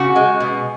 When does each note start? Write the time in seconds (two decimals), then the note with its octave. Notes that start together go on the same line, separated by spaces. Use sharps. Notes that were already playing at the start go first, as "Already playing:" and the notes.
Already playing: C#3 F#4
0.16 G#3
0.40 B2